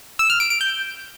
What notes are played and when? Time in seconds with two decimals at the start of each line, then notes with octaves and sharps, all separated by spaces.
0.19 E6
0.30 F6
0.40 D7
0.50 D7
0.61 G6